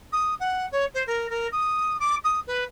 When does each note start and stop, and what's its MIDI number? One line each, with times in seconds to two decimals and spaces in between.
0.12 0.34 87
0.39 0.66 78
0.72 0.85 73
0.94 1.03 72
1.06 1.27 70
1.29 1.47 70
1.52 1.97 87
1.99 2.15 86
2.24 2.40 87
2.47 2.63 71